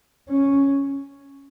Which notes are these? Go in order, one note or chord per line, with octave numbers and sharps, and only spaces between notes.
C#4